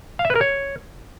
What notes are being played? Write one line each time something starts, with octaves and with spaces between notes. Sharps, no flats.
F5
E5
B4
A#4
C#5